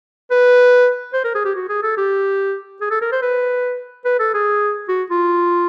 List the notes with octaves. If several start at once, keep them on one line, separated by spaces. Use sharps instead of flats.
B4
C5
A#4
G#4
G4
F#4
G#4
A4
G4
G#4
A4
A#4
C5
B4
B4
A4
G#4
F#4
F4